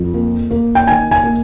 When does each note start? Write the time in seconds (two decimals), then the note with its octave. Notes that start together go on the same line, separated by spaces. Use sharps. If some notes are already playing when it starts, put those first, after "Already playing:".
Already playing: F2
0.14 A#3
0.51 A#3
0.75 G5
0.87 D#3 G#5
1.11 G#5
1.23 A#3